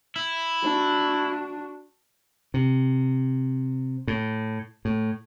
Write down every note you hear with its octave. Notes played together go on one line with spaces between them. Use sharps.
E4
D4 F#4
C3
A2
A2